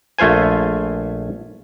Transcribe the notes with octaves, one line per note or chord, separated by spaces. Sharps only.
A#1 A3 F4 C5 G#5